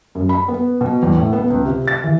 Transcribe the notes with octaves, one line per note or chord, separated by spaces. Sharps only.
F#2
B5
B3
B2
E2
A2
B3
C#2
C3
A6
E3